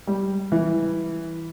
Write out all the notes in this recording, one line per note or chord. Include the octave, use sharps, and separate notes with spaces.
G3
E3